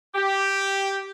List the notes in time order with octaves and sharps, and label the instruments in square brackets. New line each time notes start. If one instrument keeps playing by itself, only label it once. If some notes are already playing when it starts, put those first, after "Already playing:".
[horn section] G4